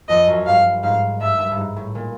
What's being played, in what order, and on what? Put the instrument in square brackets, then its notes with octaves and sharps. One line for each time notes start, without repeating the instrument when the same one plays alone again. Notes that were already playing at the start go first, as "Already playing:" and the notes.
[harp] F2 [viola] D#5
[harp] F#2
[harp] G2 [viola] F5
[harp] G#2 [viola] F5
[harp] G2 [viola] E5
[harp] G2
G2
G#2
A2
A#2